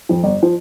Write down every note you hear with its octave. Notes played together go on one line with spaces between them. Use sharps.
F2 F3
G1
F3